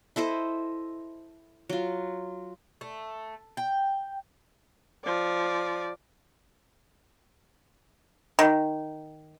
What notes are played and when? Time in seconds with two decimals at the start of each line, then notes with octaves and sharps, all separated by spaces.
0.16 E4 A4 C5 D#5
1.70 F#3 F4
2.81 A3
3.57 G5
5.04 F3 D5
8.39 D#3